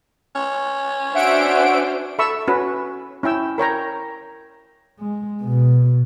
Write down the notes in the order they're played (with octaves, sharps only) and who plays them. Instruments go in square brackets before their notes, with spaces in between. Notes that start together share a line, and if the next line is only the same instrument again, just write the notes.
[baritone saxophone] C#4
[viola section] D4 F#4 C5 [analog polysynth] E5 F#5 D7
[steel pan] A4 E5 B5 C#6 E6
C#4 F#4 B4
C#4 E4 G5 E6
A#4 C#5 G5 A#5
[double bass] G#3
B2